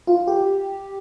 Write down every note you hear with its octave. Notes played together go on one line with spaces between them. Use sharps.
F4
G4